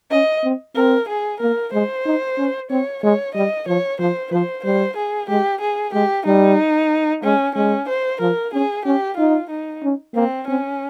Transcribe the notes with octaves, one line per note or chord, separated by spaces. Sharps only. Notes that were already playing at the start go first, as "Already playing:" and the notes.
C#4 D#5
C4
C4 A#4
G#4
A#3 A#4
G#3 C5
D#4
C#4
C4 C#5
G#3 C#5
G3 D#5
F3 C#5
F3 C5
F3 C5
G3 C5
G#4
G#3 G4
G#4
G#3 G4
G3 D#4
G#3 C#4
G#3 C#4
C5
F3 A#4
C#4 G#4
C#4 G4
D#4 F4
D#4
C#4
A#3 C4
C4 C#4